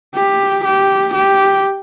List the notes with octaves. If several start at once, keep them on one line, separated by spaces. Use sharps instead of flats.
G4
G4
G4